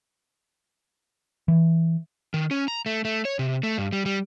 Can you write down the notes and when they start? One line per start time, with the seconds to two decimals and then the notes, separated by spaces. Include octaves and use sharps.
1.48 E3
2.34 D#3
2.51 C#4
2.68 A#5
2.86 A3
3.05 A3
3.25 C#5
3.39 C3
3.63 A3
3.78 G2
3.92 G3
4.06 G3